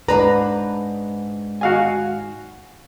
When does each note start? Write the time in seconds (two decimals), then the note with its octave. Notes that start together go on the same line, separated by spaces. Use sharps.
0.08 G#2 D4 B4 A#5
1.61 F#4 F5 G#5